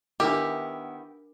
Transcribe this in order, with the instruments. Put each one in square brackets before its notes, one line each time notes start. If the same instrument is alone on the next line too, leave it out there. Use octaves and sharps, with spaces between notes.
[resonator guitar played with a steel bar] D#3 B3 E4 [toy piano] D4 A#4 D6 [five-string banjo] G4